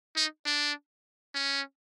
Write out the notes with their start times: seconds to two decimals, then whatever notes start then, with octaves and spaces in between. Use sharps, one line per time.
0.17 D#4
0.46 D4
1.35 C#4